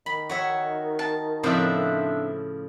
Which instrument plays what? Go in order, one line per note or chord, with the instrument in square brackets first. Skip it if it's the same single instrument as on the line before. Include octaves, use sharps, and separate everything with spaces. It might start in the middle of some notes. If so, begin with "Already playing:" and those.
[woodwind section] D#3 [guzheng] B5
[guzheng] F#4 C#5 E5
[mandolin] A5
[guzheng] A2 C#3 F3 [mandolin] C4 D4 E5